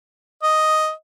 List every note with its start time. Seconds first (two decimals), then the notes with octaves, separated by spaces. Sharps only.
0.43 D#5